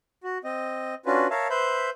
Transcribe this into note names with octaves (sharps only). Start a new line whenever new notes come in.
F#4
C4 D#5
C#4 D4 F4 F#4 B4
A#4 C#5 E5 F5 A5
B4 C5 E5 B5 G6